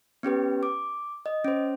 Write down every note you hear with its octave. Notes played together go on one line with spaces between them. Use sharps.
B3 C#4 G4 B4
D6
D#5
C#4 C5